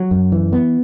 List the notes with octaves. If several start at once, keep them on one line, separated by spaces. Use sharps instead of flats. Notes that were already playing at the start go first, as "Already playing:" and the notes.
Already playing: F#3
F#2
E3
B3